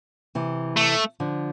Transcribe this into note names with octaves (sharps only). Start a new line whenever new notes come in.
C3 E3
A3
D3 F3